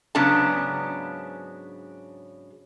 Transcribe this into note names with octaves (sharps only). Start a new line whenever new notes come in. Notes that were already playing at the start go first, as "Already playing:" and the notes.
G#2 C#3 F#3 B3 D4 A5